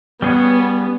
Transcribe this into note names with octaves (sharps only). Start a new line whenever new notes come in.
G3 B3 C#4 G#4 C#5